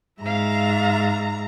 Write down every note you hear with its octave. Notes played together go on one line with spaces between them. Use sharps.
G#2 E5 F5 A#5